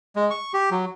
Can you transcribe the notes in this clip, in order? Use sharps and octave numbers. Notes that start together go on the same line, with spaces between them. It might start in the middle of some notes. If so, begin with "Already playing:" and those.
G#3
C#6
G4
F#3